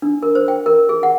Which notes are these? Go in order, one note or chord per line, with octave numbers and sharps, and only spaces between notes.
D4
A#4
C5
G5
A#4
G#4
F#5